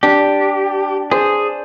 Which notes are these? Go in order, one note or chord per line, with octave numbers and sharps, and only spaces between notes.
D4 G4
G#4 C5 D5